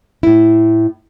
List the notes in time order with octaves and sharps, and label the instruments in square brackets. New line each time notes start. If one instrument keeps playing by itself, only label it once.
[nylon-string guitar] A2 E4